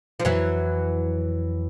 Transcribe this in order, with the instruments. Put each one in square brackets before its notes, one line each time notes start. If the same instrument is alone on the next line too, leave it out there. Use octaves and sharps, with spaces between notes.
[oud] F3
[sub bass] F2 [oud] E3 F#3